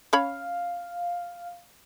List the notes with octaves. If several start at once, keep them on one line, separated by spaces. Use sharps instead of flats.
C#4 C#5 F5 B5